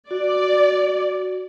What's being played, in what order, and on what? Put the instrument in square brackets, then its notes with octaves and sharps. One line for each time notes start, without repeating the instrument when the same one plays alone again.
[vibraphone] F#4 [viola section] D5